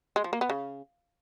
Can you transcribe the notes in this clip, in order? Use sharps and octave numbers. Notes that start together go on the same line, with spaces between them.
G#3
F3
A#3
B3
C#3